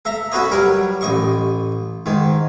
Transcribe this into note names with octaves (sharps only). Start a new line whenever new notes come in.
A4 E5 A#5
C#4 F#4 A4 B4 C#5 D#5
F#3 G3 A#4
A1 D#5 C#6
G#2 D#3